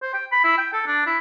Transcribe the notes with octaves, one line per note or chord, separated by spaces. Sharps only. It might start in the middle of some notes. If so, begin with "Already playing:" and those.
C5
G5
B5
E4
G5
A4
D4
E4